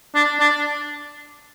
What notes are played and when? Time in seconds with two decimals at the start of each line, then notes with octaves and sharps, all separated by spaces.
0.15 D4
0.40 D4